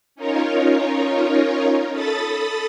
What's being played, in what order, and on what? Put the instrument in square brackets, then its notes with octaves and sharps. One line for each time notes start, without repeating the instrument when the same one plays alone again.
[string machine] C#4 D#4 F4 A#4 C#5
A4 B5 D#6 A6